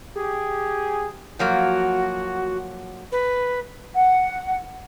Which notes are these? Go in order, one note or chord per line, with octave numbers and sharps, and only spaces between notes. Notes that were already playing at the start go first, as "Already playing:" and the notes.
G4 G#4
F3 F#3 A#3 F#4
B4
F#5